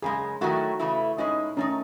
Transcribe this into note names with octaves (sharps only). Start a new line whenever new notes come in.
F#2 C#3 G#3 G#4
D#3 F#3 A3 E4 F#4
C#3 E3 A3 E4
B2 G#3 C#4 D#4 E4
D#3 A3 C#4 D#4